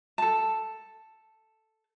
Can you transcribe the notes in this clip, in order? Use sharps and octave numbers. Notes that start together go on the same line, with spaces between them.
A4 A5